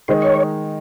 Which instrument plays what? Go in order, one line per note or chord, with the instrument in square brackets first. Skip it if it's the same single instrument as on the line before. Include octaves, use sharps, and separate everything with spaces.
[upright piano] D#3 G#3 D#4 [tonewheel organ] C5
[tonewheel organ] C#5